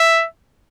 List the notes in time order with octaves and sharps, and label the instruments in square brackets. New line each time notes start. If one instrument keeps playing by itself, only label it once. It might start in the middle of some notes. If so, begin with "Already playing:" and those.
Already playing: [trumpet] E5